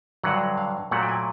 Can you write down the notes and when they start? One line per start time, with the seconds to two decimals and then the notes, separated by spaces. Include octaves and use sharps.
0.23 G2 D3 F#3 F#5
0.58 F5
0.91 A#2 F#3 A3 F#5
1.03 G5
1.09 G#5